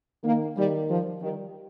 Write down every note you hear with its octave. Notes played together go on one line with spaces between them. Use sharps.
D#3 A#3
D#3 G3
F3
D#3 G3